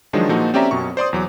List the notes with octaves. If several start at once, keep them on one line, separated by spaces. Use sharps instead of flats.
D#3 F3 F#3 G#3 D4
A#2 F3 A#3 D#4 F#4 A4
C4 C#4 G4 D5 E5 A#5
F#2 B2 C#6
C5 D5 C6 D#6
E2 F#3 D6